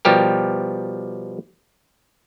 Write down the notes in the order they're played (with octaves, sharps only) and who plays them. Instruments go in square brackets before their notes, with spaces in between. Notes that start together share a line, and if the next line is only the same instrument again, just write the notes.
[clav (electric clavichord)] B2 F3 G3 G4 A#4